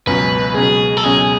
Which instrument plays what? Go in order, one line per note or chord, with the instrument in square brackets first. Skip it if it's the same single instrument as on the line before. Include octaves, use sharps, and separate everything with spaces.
[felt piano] C#2 B2 F#3 C#4 [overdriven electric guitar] B4
[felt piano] C#2 B2 F#3 C#4 [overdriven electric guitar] G#4
[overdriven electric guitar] A4
[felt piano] C#2 B2 F#3 C#4 [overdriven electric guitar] G#4